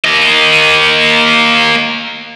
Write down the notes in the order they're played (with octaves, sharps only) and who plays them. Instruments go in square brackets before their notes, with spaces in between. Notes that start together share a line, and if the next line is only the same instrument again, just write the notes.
[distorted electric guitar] A#3 D#5